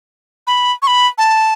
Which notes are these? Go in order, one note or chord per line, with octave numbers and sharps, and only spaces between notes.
B5
C#6
B5
A5